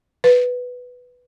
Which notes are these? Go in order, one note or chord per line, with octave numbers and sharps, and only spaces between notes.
B4